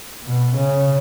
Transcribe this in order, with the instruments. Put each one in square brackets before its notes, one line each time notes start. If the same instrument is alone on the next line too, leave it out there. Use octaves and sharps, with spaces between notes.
[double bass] B2
C#3